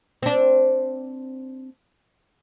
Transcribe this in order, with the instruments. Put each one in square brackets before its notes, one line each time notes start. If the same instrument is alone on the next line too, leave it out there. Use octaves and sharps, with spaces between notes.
[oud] C4 D4